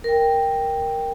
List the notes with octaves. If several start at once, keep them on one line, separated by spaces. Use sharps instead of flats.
A#4 G5